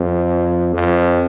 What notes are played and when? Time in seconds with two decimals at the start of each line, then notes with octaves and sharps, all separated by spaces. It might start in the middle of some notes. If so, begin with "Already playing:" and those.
Already playing: F2
0.74 F2